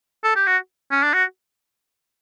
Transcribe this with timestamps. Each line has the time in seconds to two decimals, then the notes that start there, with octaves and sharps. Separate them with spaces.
0.24 A4
0.36 G4
0.47 F#4
0.91 C#4
1.03 D4
1.13 F#4